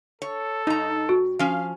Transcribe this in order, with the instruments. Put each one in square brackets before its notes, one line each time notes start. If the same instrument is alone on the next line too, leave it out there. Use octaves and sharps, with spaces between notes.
[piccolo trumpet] A4 [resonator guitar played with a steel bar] C#5
[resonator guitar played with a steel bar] G2 A#5 [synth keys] D#4
[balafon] F#4
[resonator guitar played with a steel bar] F3 C#4 [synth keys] F5